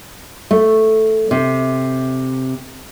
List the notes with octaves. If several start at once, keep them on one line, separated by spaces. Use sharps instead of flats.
A3
C3